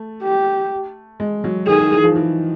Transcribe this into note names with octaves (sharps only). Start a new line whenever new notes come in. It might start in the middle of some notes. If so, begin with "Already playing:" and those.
Already playing: A3
G4
G#3
F#3
D#3 G#4
D#3
E3
F3
E3